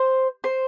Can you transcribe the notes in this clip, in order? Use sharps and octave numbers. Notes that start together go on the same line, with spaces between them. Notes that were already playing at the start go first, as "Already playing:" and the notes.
Already playing: C5
C5